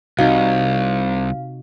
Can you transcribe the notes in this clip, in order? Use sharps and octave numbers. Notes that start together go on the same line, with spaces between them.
C2 C3 D#4 F#4 F5